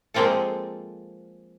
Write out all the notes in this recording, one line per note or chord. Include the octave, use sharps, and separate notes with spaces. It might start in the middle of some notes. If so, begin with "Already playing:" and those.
F3 G#3 A#3 C4 F4 A4